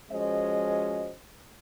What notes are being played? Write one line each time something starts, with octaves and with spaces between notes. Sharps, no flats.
F3 G#3 C#4 F#4 C5 D#5